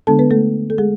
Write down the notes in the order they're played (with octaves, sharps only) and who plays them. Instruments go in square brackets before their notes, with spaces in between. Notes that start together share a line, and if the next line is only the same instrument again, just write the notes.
[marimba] D3 G#3 B3 D4 A4 A5
B3 B4
A3 A4
A4
G#3 G#4